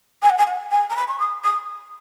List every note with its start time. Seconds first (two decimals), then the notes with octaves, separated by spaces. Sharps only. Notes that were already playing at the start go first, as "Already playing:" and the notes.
0.22 G#5
0.30 F#5
0.38 G#5
0.47 F#5
0.71 G#5
0.90 A#5
0.96 B5
1.08 C#6
1.19 D#6
1.44 D#6